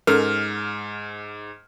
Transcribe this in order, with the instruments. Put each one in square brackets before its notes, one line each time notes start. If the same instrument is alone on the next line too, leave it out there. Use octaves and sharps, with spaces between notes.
[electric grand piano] G#2 F6 [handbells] C#4 A4 A#4